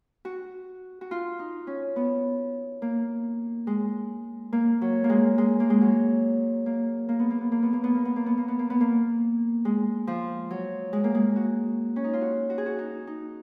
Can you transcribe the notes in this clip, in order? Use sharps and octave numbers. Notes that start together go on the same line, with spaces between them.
F#4
F#4
F4
D#4
C#4
B3
A#3
G#3
A#3
F#3
A#3
G#3
G#3
A#3
G#3
F#3
A#3
A#3
B3
A#3
B3
A#3
B3
A#3
B3
A#3
B3
A#3
B3
A#3
B3
A#3
B3
A#3
G#3
F3
F#3
G#3
A#3
G#3
F#4
C#4
D#4
F4
F#4
F#4
G#4
F#4
D#4
D#4